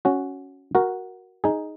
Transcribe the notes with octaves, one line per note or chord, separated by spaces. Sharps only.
C#4 F#4
F#4 A#4
D#4 G#4